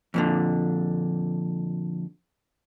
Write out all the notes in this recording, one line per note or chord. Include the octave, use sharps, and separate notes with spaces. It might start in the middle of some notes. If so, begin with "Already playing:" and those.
F2 A#2 D3